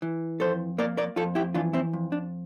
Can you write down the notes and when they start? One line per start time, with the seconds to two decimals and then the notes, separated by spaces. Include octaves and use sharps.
0.02 E3
0.40 F2 A4 C5
0.78 A#3 A#4 D5
0.97 A#4 D5
1.16 F2 F4 A4
1.35 E4 G4
1.54 E3 D4 F4
1.73 C4 E4
1.93 F2
2.12 D4